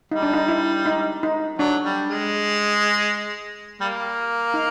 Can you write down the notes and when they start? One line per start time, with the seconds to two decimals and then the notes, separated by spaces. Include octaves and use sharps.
0.12 G3 D#4
0.23 D4
0.33 D#4
0.48 E4
0.86 D#4
1.23 D#4
1.59 F#3 D4
1.84 G3
2.09 G#3
3.81 G3 A#3
4.54 D#4